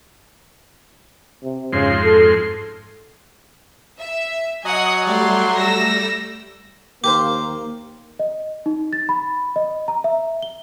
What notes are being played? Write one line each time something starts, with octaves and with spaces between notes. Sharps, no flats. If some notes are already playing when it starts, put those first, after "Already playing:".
C3
F2 G#2 C#3 C6
A4
E5
F#3 D#5 F#5 G#5 D#6
G3 A3 D5 C6
E6 A#6
D#2 A#3 G4 A#4 C5 D6
D#5
D#4
A6
B5
D#5
A#5
E5
G7